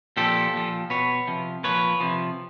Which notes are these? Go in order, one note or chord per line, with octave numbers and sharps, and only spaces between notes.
A#2 F3 G4 A4
A#2 F3
B2 B4 C#5
C3 F3
A#2 F3 B4 C#5
C3 F3